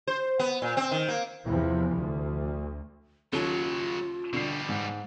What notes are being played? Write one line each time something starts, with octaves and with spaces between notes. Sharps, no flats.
C5
B3
A#2
C4
D#3
A#3
E2 C3 E3 F3
D2
D#2 C#3 F#3 C#4 F4 A4
B2 D3 G3 C7
G#2